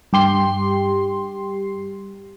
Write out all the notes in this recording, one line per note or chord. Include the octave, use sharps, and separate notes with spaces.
G2 G4 C6 C7